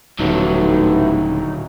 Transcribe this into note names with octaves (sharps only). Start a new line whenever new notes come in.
D#1 A1 D3 F#3 B3 D#4 E4